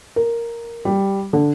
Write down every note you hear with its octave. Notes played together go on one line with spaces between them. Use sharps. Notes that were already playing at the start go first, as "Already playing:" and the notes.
A#4
G3
D3